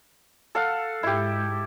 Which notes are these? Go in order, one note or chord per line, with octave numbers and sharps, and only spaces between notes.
A4 F5 F#5
G#2 E4 G4